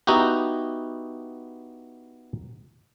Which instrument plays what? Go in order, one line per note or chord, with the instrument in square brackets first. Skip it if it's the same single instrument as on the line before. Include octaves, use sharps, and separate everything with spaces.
[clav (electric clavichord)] B3 D#4 E4 F#4 G4